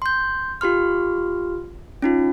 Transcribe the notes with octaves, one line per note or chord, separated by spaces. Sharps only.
C6 G6
F4 G4 C6 F6
C#4 D#4 F4